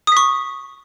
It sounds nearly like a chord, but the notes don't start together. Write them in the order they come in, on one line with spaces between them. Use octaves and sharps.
D#6 B6 C#6